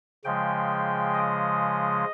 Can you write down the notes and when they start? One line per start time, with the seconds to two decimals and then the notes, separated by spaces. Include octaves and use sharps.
0.24 C#3 F3 G#3 G5
1.14 D#5